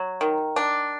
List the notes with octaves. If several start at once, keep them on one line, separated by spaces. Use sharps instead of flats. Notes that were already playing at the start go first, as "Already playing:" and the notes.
Already playing: F#3
D#3
D4